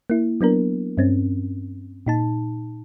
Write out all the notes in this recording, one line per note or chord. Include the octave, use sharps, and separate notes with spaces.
A#3 E4
F#3 B3 D4 A#4
G2 C4 C#4
A#2 D#4 A5